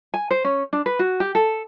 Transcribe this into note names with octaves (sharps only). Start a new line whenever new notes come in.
G#5
C5
C#4
D4
B4
F#4
G4
A4